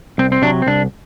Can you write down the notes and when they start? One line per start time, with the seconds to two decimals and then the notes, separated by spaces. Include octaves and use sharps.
0.18 C2 C4
0.32 C4
0.42 C3 F#3 D4
0.62 C4
0.67 C2 D4